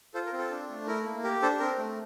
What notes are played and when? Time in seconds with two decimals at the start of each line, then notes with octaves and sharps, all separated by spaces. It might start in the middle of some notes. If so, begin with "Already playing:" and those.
0.14 F4 A4 C5
0.26 A#4
0.33 C4
0.38 A4
0.51 D4
0.70 A3
0.87 E4 A#4
1.05 A#3
1.24 G4 A#4
1.42 D4 A4 C5
1.60 C4 A#4
1.78 A3